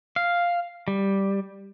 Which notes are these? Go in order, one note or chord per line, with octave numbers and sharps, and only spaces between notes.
F5
G3